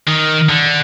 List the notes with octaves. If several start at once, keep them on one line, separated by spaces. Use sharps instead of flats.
D#3
D3